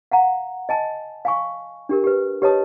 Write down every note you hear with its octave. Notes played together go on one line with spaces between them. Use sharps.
F5 F#5 A#5
D#5 G#5 A5
F5 G#5 C#6
D4 G4 A#4
G4 B4
G4 B4 C#5 D#5 A5 D#6